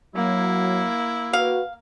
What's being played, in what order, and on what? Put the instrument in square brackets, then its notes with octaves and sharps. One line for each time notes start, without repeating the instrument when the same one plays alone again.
[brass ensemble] F#3 [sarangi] A#3 [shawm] E4
[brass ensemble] F#4 B4 [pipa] F5